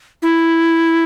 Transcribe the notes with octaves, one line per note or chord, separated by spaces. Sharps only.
E4